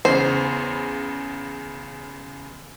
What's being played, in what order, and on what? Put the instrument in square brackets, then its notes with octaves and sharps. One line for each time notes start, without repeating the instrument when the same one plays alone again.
[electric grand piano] E2 C#3 [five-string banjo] C5